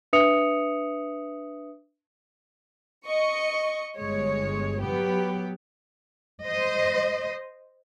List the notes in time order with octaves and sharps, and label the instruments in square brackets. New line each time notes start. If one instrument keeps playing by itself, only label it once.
[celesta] D4 B4 E5 D#6 C#7 F7
[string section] D#5 C#6
G1 G#3 C#5
F#3 B3 G4
[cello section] C5 D#5